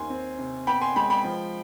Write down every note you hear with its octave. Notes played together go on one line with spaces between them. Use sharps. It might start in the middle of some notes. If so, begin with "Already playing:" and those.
Already playing: D#2 G#5 C6
C4
C3
B3 G5 B5
G#5 C6
G#3 G5 B5
G5 B5
F3